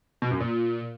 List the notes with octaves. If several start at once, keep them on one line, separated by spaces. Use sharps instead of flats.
B2
F#2
A#2